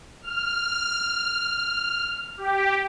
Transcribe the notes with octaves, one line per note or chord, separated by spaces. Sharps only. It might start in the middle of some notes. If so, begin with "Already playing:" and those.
F6
G4